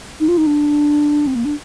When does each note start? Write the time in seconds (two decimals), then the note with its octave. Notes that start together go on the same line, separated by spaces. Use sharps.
0.20 D#4
0.28 F4
0.38 D#4
0.47 D4
1.27 C4
1.35 A#3
1.45 D4